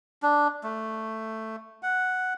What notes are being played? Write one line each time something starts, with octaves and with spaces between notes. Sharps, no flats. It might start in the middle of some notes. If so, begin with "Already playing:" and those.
D4
A3
F#5